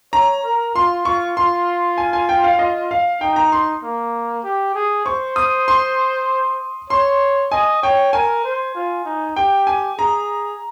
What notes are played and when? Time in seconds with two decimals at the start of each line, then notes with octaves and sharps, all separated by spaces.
0.13 C#5 A#5
0.44 A#4
0.75 F4 C6
1.05 F4 C#6
1.37 F4 C6
1.98 G#5
2.13 G#5
2.29 G5
2.44 F5
2.59 D#5
2.91 F5
3.21 D#4 G5
3.36 A#5
3.52 C6
3.83 A#3
4.44 G4
4.75 G#4
5.05 C5 C#6
5.36 D#6
5.68 C6
6.90 C#5 C6
7.52 D#5 G#5
7.82 C#5 G5
8.13 A#4 G#5
8.44 C5
8.75 F4
9.05 D#4
9.36 G4 G5
9.67 G#5
9.98 G#4 A#5